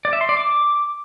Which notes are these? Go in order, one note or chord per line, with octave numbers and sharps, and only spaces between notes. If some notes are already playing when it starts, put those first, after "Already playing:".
D5
E5
C6
D5
D6